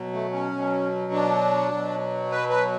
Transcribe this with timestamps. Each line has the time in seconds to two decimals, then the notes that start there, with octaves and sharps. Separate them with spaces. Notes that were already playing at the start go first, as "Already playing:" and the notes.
Already playing: B2 F#3
0.13 A3
0.32 C#4
0.52 B2 F#3
1.12 D4
1.72 B2 F#3
2.31 B4
2.50 B4